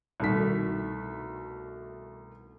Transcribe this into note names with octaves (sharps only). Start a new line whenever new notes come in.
C2 B2 D#3 A3 B6